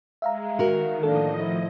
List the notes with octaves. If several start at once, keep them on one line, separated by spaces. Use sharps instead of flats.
G#3 E5 F5 A#5
D#3 F#4 A#4
A2 F3 A#3 D4 A4 D#5
E4